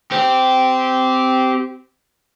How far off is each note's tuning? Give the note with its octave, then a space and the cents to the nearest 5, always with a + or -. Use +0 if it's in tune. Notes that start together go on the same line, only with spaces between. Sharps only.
C4 -15 G4 -10